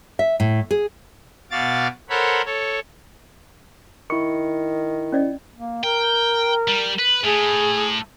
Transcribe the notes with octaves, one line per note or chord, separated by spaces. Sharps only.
E5
A2
G#4
B2 F#4 F5 D6 A6
A4 A#4 C5 C#5 F#5 B5
A4 C#5
D#3 E4 C#6 C#7
C#4 D5 D#5
A#3
A#4 G5
G3
B4
A2 G#4